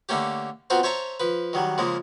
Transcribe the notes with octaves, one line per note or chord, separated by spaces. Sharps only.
D3 A3 A#3 C#4 G4
B3 C4 F4 F#4 A#4 C5
C5 C#5 E5 A5 A#5 C#6
F3 B4
D#3 F#3 G3
C#3 F3 G#3 A#3